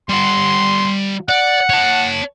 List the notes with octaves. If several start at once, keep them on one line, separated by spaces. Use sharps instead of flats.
G3 F#5 C6
D5 F#5
C#5 A5